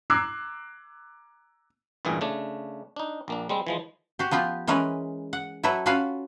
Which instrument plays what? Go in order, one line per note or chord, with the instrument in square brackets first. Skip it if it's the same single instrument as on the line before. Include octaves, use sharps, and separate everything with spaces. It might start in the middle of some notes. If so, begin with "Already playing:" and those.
[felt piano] A#5 D6 E6 F#6 G#6 C7
[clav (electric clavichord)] A1 G2 A#2 E3 G#4
C#3 A3 D4
D4 D#4
A#1 A#3 D4
G3 G#3 C4
E3 F3 G#3
[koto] F#4 G4
F3 B3 F4 G4
E3 G#3 C#4 A#4 B4
F#5
F#3 E4 A4 B4 E5
C#4 F4 F#4 B4 F5